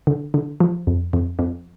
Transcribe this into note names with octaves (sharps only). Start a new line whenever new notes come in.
D3
D3
F3
F2
F2
F2